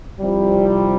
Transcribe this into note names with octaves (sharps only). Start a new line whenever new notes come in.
C2 C3 F3 G3